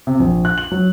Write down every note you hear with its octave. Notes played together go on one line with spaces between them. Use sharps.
C3
A#1
F#6
F#7
F#3